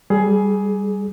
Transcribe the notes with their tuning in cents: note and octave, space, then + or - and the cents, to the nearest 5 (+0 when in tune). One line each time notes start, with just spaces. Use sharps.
G3 +0 G#4 +20